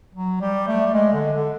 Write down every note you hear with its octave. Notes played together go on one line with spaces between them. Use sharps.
F#3
G3
A3
G3
G#3
D3
D3